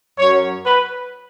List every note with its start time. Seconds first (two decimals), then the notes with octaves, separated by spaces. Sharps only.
0.18 F#2 F#3 C#5
0.66 B4